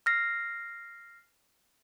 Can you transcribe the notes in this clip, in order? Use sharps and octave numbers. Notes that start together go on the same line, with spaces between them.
F6 A#6 C7